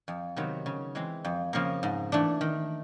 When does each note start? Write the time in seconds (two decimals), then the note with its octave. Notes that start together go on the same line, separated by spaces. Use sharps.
0.08 F2
0.36 C3 D#3 F#3 B3
0.66 C#3
0.95 E3 G#3 C4
1.25 F2
1.53 C#3 F3 A#3
1.83 G#2
2.12 E3 A3 D4
2.41 D#3